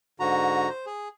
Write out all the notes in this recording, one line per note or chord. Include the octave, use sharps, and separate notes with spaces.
G#2 D3 F#4 A#5
C5
G#4